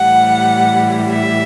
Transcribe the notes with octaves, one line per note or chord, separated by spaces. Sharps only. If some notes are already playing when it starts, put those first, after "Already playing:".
Already playing: A2 E3 G3 F#5
E5